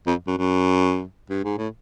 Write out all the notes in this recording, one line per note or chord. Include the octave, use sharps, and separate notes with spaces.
F2
F#2
F#2
G2
G#2
A2